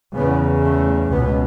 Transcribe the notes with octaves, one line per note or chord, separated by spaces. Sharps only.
E2 C#3 B3
A3
C#2 B2 B3